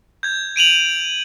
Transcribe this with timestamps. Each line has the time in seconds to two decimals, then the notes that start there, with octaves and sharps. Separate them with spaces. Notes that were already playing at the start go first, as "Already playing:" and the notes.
0.23 G6 G#6
0.56 D7 D#7 F7 F#7